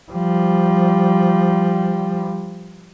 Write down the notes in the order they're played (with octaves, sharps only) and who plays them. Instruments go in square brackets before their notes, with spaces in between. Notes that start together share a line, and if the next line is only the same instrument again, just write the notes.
[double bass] F3 G3